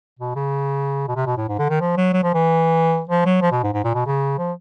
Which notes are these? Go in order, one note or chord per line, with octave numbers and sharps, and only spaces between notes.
B2
C#3
B2
C3
B2
A2
G#2
D3
D#3
F3
F#3
F#3
F3
E3
F3
F#3
F3
B2
G#2
G#2
A#2
B2
C#3
F3